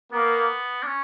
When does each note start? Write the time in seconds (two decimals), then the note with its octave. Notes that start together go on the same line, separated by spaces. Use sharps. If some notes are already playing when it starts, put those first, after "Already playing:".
0.12 A#3 B3
0.83 D4
0.87 C#4